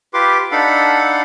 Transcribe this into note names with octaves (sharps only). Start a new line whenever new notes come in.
F4 G4 B4 C6 D6
D4 D#4 A4 F5 F#5 B5